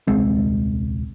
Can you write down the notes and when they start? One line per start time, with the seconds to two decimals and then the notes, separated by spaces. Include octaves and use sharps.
0.07 D#1 C2 G#3 C4